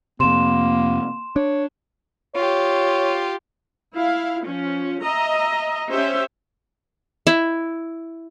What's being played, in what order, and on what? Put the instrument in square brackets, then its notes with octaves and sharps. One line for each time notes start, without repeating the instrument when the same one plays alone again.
[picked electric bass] F2 C3 [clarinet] A#3 [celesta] C6 E7
[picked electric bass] D4 [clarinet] C#5
[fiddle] F4 G4 [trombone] C#5
[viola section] E4 F5
F3 C#4
D#5 E5 A#5
C#4 G4 C5 E5
[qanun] E4